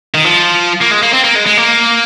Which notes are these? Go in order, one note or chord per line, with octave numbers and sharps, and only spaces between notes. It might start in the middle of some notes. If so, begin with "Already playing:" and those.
D#3
F3
A#3
G#3
A#3
C4
A#3
G#3
G#3
A#3